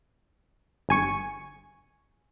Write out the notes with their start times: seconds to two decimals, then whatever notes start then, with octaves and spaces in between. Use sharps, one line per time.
0.89 G1 G#5 C#6